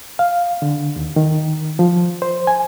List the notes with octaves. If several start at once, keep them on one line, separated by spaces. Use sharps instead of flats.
F5
D3
D#2
D#3
F3
C5
G#5